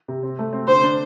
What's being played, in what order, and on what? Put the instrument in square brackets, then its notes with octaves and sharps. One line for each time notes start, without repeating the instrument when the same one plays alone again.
[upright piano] C3
C4
A3
C4
[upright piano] D3 [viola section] C5
[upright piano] D4